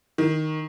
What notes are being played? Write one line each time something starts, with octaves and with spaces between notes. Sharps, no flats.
D#3